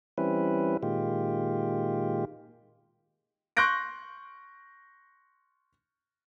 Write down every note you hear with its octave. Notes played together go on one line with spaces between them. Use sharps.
E3 G3 C4 C#4 E4 B4
A#2 D#3 G#3 F4 G4
C6 C#6 F#6 G6 A#6 D7